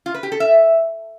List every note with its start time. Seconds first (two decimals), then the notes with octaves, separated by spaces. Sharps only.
0.06 F4
0.14 B4
0.23 G4
0.32 A4
0.40 E5